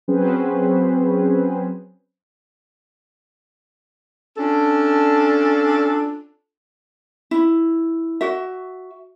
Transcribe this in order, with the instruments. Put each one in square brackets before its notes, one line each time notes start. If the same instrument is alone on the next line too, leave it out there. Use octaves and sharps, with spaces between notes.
[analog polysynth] F#3 C4 C#4 G#4 B4 C5
[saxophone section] C#4 D4 F4 A4
[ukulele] E4
F#4 E5